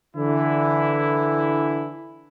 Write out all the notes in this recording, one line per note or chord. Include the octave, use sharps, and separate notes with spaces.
D3 E3 E4